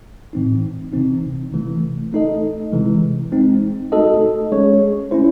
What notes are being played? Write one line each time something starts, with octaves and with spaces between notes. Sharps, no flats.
A2 E3 C4 D#4
C3 E3 C4 D#4
C3 E3 A3
A3 D#4 A4 D#5
C3 E3 G#3
G#3 C4 D#4
A3 D#4 F#4 A4 D#5
G#3 C#4 G#4 C#5
A3 C#4 E4 C5